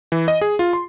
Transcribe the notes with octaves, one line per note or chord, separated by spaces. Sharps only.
E3
D#5
G#4
F4
C6